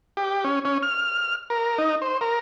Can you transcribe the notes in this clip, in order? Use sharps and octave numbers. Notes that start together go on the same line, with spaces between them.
G4
C#4
C#4
F6
A#4
D#4
C5
A#4